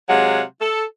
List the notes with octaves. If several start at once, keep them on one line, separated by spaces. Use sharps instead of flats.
C3 F#3 G#3 F5 F#5
A4